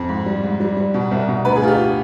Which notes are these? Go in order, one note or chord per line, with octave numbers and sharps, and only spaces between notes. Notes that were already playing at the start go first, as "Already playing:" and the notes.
Already playing: F2
G#2
G3
G#2
G3
G3
B2
C2
B2
D2 B4
G#4
D2 F4
G4